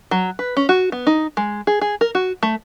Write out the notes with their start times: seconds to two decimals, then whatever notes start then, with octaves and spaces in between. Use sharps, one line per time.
0.11 F#3
0.39 B4
0.57 C#4
0.69 F#4
0.92 B3
1.07 D#4
1.37 G#3
1.67 G#4
1.81 G#4
2.01 A#4
2.15 F#4
2.43 A3